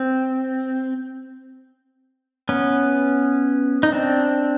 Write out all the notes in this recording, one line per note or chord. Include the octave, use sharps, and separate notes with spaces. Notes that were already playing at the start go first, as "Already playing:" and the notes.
Already playing: C4
B3 C#4
D#4
C4 D4